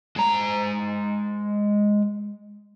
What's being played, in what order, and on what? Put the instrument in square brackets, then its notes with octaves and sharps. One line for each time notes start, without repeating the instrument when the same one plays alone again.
[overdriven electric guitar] G#3 A#5